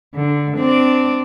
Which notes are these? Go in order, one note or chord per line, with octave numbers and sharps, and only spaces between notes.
D3
C4 D4 D5